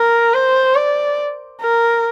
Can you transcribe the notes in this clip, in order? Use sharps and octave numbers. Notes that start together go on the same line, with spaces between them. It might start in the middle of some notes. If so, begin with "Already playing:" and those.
Already playing: A#4
C5
D5
A#4